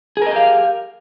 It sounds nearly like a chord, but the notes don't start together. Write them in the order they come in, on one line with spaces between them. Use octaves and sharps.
G#4 A#4 D#5 G4 F5